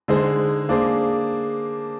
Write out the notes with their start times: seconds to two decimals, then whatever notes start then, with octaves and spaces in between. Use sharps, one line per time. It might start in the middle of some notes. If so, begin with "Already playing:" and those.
0.08 D3 G#3 D#4 G#4 C5
0.69 A#3 D4 G#4 C5